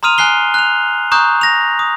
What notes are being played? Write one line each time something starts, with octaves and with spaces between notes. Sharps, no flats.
A#5 C6 D#6 F6 D#7 F7
G#5 F#6 C7 G7
F#6 F7
A#5 C#6 D#6 F#6 G6
A#6 F7
D#6